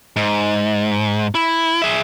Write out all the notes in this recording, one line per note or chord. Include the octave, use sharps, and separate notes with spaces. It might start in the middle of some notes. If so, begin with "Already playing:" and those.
G#2
E4
G#4 E5